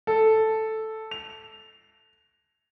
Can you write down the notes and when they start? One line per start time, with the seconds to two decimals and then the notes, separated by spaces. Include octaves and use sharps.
0.07 A4
1.11 F7